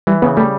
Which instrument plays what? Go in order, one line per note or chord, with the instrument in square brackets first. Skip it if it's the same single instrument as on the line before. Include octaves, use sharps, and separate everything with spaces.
[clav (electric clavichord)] E3 [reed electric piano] G3
[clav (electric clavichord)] C#3 [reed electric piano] B3
[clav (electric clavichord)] G3 [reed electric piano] A3